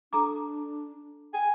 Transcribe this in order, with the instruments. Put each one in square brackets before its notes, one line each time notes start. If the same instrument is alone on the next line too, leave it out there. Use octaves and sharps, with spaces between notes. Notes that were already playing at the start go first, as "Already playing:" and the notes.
[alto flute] D4 [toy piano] A4 A#5 D6
[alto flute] G5 [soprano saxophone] G#5